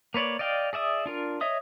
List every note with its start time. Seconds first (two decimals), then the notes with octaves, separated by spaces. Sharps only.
0.14 A#3 B4 C#5 D5
0.39 D5 D#5 F5 G5
0.73 G#4 D5 E5 D#6
1.06 D4 F4 A#4
1.41 C#5 D#5 E5 D#6